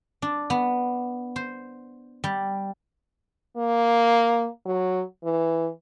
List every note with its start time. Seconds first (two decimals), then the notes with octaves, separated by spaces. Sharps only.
0.22 D4
0.50 B3
1.36 C5
2.24 G3
3.57 A#3
4.66 F#3
5.24 E3